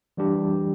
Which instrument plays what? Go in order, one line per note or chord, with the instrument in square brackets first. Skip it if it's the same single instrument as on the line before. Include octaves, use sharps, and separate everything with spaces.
[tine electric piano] E3 G3 D4 G4